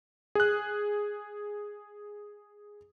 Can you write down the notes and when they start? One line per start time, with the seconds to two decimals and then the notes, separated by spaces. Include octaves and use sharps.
0.35 G#4 F#6